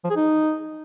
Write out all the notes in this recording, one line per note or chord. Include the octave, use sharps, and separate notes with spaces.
F3
G#4
D#4